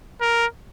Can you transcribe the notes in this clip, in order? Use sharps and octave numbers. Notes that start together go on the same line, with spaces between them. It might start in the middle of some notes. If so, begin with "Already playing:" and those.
A#4